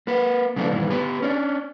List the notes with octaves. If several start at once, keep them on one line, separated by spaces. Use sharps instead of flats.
A#3 B4
C#3 E3 F#3 A3 B3 D4
G2 A#2 D#3 E3
B3 G4 B4
C#4 D4